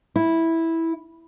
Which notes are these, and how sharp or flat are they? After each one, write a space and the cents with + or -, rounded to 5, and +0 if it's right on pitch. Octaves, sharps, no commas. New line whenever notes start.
E4 -10